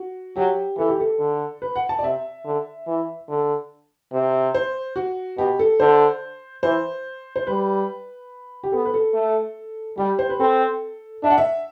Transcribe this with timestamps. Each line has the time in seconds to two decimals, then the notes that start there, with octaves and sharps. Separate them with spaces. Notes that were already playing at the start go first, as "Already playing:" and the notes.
Already playing: F#4
0.36 F#3 G4
0.78 E3 A4
0.89 G4
1.00 A4
1.19 D3
1.62 B4
1.76 F#5
1.89 A5
1.99 D5
2.03 C3 E5
2.45 D3
2.87 E3
3.29 D3
4.12 C3
4.55 C5
4.96 F#4
5.37 B2 G4
5.59 A4
5.80 D3 C5
6.63 E3 C5
7.36 C5
7.47 G3 B4
8.64 G4
8.72 B3 A4
8.85 B4
8.94 A4
9.14 A3
9.97 G3 G4
10.19 C5
10.30 B4
10.40 C4 A4
11.23 D4 E5
11.30 F#5
11.38 E5